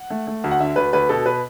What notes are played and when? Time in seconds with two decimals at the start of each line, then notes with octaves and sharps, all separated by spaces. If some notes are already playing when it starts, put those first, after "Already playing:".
Already playing: F#5
0.10 A3
0.27 A3
0.44 D2
0.51 F#5
0.60 D3 E5
0.76 D2 B4
0.93 D2 B4
1.09 B2 A4
1.26 B2 B4